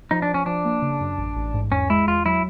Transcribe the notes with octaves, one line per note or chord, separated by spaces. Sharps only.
F3 D#4
D4
F3
C#4
F3 D4
A#3
C#3
F#2
A1
A1
G#2
E2 C#4
G#3 E4
E2 F4
F#3 E4